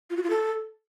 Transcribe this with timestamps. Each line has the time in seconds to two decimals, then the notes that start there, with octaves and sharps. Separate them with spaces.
0.10 F4
0.17 F#4
0.23 F4
0.30 A4